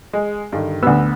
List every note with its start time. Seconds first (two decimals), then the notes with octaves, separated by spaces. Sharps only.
0.13 G#3
0.52 G2 D3 D#3
0.83 D2 B3 E6